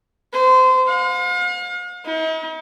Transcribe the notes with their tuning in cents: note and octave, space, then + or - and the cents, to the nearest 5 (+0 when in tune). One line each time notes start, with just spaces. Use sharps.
C5 -25
F5 +45
D#4 +45